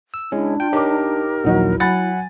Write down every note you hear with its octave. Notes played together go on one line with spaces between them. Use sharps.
E6
G#3 C#4 D4 E4
F4 G5
D#4 G4 A#4 C#5 D6
A#1 D#2 F#3 D#4 E4 F#4
F#3 F#5 G#5 B5 A6